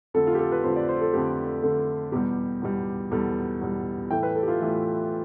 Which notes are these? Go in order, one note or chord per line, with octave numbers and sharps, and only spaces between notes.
F2 D3 A3 A4
F4
G4
A4
B4
F2 D3 A3 C5
D5
C5
A4
F2 D3 A3 G4
F2 D3 A3 A4
E2 B2 G3 G4
E2 B2 G3
E2 B2 G3 A4
E2 B2 G3
A2 E3 A3 G5
B4
A4
G4
F4
A2 E3 A3